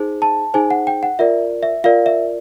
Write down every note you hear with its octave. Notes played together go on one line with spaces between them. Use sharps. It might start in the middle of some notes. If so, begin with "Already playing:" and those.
Already playing: D#4 G#4 C5
A5
D#4 G#4 C5 G#5
F#5
G5
F#5
F4 A#4 D5 E5
E5
F4 A#4 D5 F5
E5